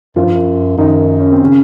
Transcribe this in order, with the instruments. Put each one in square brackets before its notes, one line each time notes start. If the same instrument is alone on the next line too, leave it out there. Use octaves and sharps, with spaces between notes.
[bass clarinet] F#2 [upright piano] F3 F4
[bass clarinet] G2
F#2
[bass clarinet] F#2 [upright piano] D#3 D#4
[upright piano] C#4
C4
C#3 C#4